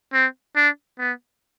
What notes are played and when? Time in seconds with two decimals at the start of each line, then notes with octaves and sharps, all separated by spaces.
0.13 C4
0.56 D4
0.99 B3